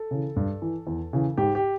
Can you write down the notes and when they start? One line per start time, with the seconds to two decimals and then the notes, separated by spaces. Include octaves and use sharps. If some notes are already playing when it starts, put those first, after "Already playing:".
Already playing: A4
0.11 C#3 E3
0.36 G2
0.62 E3
0.87 E2
1.13 C#3 E3
1.37 G#2 G4
1.55 G4